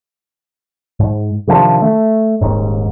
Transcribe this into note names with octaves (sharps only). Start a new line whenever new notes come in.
G#2
C3 D#3 F3 D4
A3
D#1 D#2 G#2